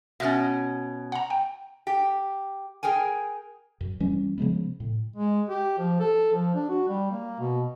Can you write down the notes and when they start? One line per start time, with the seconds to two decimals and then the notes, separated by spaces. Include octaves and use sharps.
0.20 B2 C#4 E5 F6 A6
1.12 F#5 A#5
1.30 G5
1.87 G4
2.83 G#4 A#4 G5 G#5
3.81 F#2
4.00 F#2 E3 G3 C#4
4.38 C#3 F3 G#3 B3
4.80 A2
5.16 G#3
5.49 G4
5.78 F3
6.00 A4
6.33 F3
6.54 D4
6.69 F#4
6.88 G3
7.11 A#3
7.40 B2